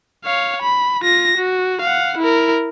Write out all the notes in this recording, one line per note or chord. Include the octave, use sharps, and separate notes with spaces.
C#5 F5
B5
F4 A#6
F#4
F5 F#5
E4 A#4